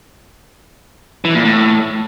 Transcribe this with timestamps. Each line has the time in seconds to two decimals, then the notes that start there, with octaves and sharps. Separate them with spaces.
1.25 E3
1.35 A#2
1.45 A2